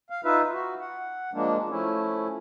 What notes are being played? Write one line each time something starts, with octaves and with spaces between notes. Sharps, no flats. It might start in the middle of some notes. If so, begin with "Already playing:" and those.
F5
D#4 F4 B4 E5
F#4
F#5
F3 G#3 A#3 D4
F3 A3 C#4 E4